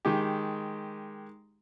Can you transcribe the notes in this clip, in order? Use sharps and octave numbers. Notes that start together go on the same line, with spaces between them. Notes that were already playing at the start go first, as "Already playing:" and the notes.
D#3 G#3 G4